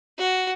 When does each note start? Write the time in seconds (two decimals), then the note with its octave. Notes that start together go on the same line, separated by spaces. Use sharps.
0.18 F#4